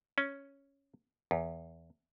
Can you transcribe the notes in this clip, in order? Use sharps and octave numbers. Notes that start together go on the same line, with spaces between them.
C#4
E2